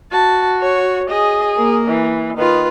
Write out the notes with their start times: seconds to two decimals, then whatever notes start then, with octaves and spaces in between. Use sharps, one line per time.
0.12 F#4 A5
0.61 C#5
1.09 G#4 D#5
1.55 A#3 A#4
1.88 E3
2.38 D#3 F4 B4